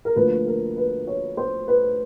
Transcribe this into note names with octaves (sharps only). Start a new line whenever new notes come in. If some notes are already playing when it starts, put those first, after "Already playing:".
A#4
D2 D3 F3 A#3 B4
A#4
B4
C#5
C5
B4